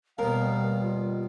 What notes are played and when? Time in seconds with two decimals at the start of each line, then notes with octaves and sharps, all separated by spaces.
0.18 D#2 B2 G3 A#4 F5
0.82 F4